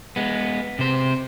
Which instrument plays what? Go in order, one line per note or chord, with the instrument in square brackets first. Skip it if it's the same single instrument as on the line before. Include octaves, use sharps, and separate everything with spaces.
[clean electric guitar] G#3 B3
C3 C5